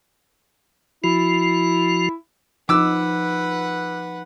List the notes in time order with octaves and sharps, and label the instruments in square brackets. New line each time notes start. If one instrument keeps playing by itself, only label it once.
[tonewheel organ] F3 F#4 [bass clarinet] E4
[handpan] F3 D#4 [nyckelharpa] B4 F#5 [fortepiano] D6 E6